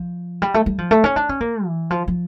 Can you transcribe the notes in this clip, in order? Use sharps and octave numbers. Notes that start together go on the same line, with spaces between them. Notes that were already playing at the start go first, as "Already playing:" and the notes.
Already playing: F3
G3
A3
G3
F3
A3
C#4
D4
C#4
A#3
E3
F3
F3